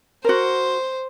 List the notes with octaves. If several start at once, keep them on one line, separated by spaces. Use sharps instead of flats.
F#4 A#4 C5